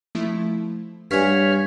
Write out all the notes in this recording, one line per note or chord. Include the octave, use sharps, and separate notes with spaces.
F3 A3 E4
G2 G3 C#5 F#5 G#5 F6 B6